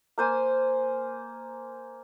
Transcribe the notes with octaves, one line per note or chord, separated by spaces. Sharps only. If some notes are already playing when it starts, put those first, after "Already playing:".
A#3 C5 G#5